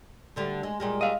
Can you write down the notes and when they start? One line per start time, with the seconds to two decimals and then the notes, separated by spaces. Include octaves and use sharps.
0.36 D2 D3 G3
0.63 G#3
0.80 A#2 G3 G#3
1.01 D#5 F5